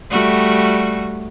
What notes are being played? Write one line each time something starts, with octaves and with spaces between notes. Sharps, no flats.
G3 A3 F#4